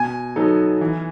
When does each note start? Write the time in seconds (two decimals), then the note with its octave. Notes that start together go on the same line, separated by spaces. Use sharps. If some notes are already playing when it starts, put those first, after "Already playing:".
Already playing: B2 G#5
0.36 F#3 B3 D#4 A4
0.81 E3